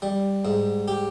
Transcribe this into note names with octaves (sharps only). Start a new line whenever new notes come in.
G3
G#2
G4